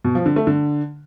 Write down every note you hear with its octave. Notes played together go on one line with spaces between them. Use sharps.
B2
F3
D3
A3
D3